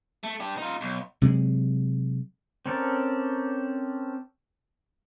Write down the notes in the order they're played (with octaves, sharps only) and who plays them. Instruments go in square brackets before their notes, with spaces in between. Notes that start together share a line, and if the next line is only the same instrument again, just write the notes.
[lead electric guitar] A3
D4 G4
D#4 F4
B1
[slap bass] C3 F#3 G#3
[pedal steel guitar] C4 C#4 A4 A#4 D5